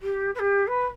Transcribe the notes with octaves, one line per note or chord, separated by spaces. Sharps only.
G4
B4
G4
B4